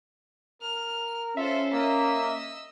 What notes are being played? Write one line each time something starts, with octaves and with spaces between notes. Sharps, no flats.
A#4 F6
C#4 F4 A4 C5 E5
A#3 D#5 E6